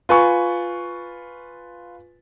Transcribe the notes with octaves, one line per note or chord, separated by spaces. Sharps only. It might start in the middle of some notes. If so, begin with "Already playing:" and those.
F4 B4 G#5 C#6